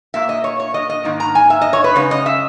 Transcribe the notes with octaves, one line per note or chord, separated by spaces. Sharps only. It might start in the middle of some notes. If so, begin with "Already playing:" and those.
A#2 A#3 E5
D#5
C#5
C#5
D#5
D#5
G#2 D#3 A#3 D#4
A#5
G#5
E5
D#5
C#5
B4
F#2 C#3 G#3 D#4 C#5
D#5
E5